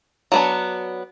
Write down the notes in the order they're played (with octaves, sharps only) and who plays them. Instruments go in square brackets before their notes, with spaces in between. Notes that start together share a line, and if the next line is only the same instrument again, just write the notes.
[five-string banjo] F#3 B3 D4